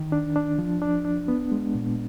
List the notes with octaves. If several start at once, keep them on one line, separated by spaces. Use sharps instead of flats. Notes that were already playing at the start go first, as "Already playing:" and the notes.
Already playing: D#3
D4
D4
F3
D4
D4
B3
G#3
A#2